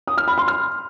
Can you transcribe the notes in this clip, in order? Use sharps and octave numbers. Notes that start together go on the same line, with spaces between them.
D#6
F6
B5
C6
F6